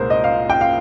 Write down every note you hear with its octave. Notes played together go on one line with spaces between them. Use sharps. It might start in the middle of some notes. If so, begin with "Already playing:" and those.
Already playing: C2 A#2 G#3 A#4 C5
D#5
F5
G5
F5